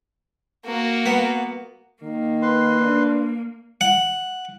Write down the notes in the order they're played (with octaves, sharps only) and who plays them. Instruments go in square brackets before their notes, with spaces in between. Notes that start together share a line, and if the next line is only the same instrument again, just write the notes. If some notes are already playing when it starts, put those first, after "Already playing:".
[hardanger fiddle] A#3 F#4
[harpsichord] B3
[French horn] D#3 [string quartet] A#3
[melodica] B4 C6
[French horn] D4
[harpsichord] F#5